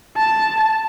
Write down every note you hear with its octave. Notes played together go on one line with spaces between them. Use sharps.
A5